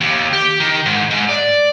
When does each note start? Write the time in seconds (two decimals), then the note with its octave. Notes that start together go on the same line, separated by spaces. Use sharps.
0.01 D#2
0.33 G4
0.60 D#3
0.86 G#2
1.11 G#2
1.29 D5